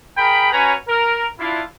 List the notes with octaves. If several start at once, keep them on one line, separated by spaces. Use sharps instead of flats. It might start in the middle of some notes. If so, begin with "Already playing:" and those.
G#4 A#4 G5 B5
C#4 F#4 B4 C#5 G#5 A#5
A#4
D4 E4 F4